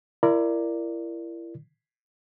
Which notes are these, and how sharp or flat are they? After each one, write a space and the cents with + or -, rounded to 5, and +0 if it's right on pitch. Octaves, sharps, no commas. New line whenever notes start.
E4 +30 A#4 +0 D5 +0